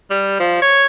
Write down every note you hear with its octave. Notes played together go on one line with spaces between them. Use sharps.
G3
F3
C#5